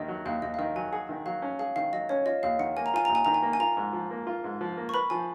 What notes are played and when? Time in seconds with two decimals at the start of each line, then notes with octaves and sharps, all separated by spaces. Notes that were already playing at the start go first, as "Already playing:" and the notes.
Already playing: D#2 D#3 D#5
0.08 F#3
0.25 D#2 F5
0.42 D#2 D#5
0.54 F5
0.59 D#3 D#5
0.76 F#3 G#5
0.92 G#4 F#5
1.09 D#3
1.26 F#3 F5
1.42 C#4
1.59 G#4 F5
1.76 D#3 F5
1.93 F#3 D#5
2.09 C#4 C#5
2.26 F4 D#5
2.43 D#2 F5
2.59 D#3 F#5
2.77 A#3 G#5
2.86 A#5
2.94 F4 G#5
3.05 D#2 A#5
3.15 G#5
3.25 D#3 A#5
3.34 G#5
3.43 A#3
3.53 G#5
3.60 F4 A#5
3.77 G#2
3.93 F3
4.11 A#3
4.27 F4
4.44 G#2
4.61 F3
4.77 A#3
4.89 C#6
4.94 B4 B5
5.10 F3 G#5